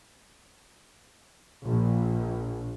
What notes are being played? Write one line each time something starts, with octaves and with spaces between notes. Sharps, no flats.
A#1